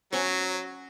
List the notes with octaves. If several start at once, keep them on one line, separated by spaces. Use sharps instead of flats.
F#3 C#4 C#5